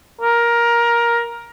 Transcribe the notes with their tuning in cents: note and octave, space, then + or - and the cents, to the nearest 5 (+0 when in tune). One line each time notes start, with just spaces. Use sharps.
A#4 +15